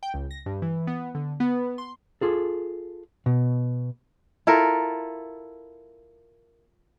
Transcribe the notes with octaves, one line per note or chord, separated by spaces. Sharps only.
G5
C#2
A#6
G2
E3
B3
D3
B3
C6
F4 G#4 A4
B2
E4 F4 A4 A#4